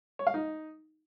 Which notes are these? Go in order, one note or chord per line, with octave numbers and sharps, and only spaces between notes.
C#5
F5
D#4